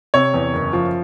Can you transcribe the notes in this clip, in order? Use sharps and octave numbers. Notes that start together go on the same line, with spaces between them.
C3 C#5
E2
F#1
F3